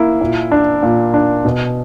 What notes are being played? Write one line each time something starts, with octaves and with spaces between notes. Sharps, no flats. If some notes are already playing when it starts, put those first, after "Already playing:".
Already playing: A#3 E4
A#2
D4
A#2
D4
B2